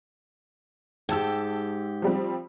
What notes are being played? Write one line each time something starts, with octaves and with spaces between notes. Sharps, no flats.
G#2 G4 G5 A5 E6
F3 G3 C4